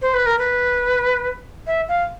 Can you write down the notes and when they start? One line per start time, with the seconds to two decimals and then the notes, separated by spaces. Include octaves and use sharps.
0.02 C5
0.14 B4
0.26 A#4
0.39 B4
1.67 E5
1.88 F5